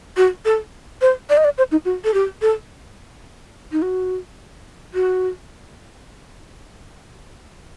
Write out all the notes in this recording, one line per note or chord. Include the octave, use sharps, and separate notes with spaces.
F#4
A4
C5
D5
D#5
D5
C5
D#4
F#4
A4
G4
A4
D#4
F#4
F#4